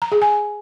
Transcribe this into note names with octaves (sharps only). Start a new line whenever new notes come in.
A#5
G#4
G#5